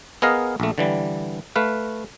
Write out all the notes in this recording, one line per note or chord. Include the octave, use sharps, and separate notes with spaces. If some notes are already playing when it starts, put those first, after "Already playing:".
B3 G#4 A#4 D#5 F5
A#1 A3
D3 E3 G3
A3 B4 F5